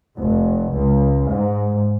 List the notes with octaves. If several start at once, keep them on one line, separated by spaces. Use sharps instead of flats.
F1
C#2
G#2